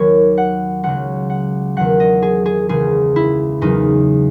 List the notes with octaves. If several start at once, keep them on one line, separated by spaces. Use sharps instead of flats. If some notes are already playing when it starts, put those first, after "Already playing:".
Already playing: D#2 D#3 F#3 C#5
F#5
C#2 C#3 F#3 F#5
F#5
E2 D#3 F#3 F#5
D#5
G#4
G#4
C#2 C#3 E3 G#4
E4
E2 C#3 F#3 D#4